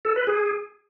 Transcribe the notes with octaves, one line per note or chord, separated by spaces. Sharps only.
A4
B4
G#4